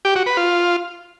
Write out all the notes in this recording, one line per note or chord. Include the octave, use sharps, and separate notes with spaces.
G4
F#4
B4
F4